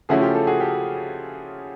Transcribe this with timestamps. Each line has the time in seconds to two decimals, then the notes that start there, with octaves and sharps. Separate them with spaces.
0.09 C#3 F3 A3 C#4 E4 F#4 G#4
0.21 F4 G4
0.34 G4 A4
0.47 F#4 G#4
0.60 G4 A4